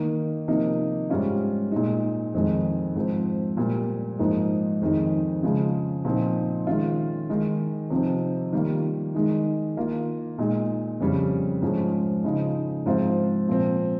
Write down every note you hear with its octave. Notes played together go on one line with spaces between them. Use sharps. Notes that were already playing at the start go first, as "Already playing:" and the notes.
Already playing: D#3 A#3 D#4
C3 F3 A#3 D#4
G#2 G3 C#4 F4
A#2 G#3 D#4
F2 D#3 G#3 D#4
G#2 F3 C4
A#2 G3 A#3
G#2 F3 A#3 D#4
F2 D#3 G#3 D#4
C#3 F3 G#3
A#2 F3 C4 D#4
D#3 G#3 C#4 F4
D#3 G#3 D#4
C3 F3 C4 D#4
D#3 G3 A#3 F4
D#3 G#3 D#4
D#3 A#3 F4
A#2 G#3 D#4
F2 C#3 G3 C#4
G#2 F3 G#3 C#4
C#3 F3 G#3 D#4
G#2 F3 C4 F4
A#2 F3 C4